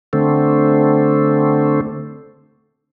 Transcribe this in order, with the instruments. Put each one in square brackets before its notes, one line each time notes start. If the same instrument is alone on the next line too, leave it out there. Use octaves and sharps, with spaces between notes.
[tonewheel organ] D3 A3 C4